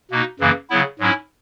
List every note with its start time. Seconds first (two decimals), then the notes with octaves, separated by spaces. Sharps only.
0.11 B2 A#3 D#4
0.40 F#2 C#3 E3 A#3
0.70 C#3 F#3 B3 E4
0.99 G#2 F#3 C#4 E4